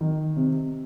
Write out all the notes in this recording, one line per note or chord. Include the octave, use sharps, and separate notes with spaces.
D#3
C3